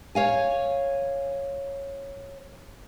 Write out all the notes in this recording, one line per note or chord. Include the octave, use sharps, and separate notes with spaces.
C#5 F5 G#5